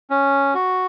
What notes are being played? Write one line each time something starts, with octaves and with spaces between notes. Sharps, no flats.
C#4
F#4